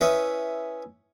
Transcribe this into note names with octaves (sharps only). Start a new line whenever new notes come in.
C#4 E4 B4 D#5